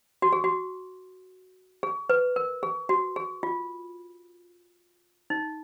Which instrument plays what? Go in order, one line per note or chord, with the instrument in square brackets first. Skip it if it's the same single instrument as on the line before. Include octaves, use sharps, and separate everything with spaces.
[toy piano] F#4
G#4
F#4
G#4
B4
A#4
G#4
F#4
G#4
F4
D#4